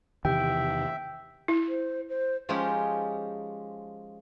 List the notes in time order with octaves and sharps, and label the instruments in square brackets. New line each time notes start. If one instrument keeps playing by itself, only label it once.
[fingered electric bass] E2 D#3 E3 [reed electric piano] C3 G4 [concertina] E5 [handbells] G5
[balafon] E4
[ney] C5
C5
[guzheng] F3 G#3 C#4 D#4 F4 G4